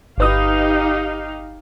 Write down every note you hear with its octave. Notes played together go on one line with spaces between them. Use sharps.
G1 D#4 G4 B4 F5 D#6